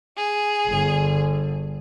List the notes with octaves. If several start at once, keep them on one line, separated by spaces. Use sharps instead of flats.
G#4
G1 D3